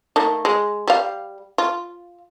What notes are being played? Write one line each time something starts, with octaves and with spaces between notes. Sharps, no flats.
D#3 A3 A#3
G#3
G3 F5
F4